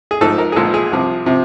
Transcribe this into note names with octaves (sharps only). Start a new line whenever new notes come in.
G#4
G#2 F3 A3 A4
A#4
G#4
B1 A#2 F3 G#3 A4
G#4
C2 C3 F3
C3 F3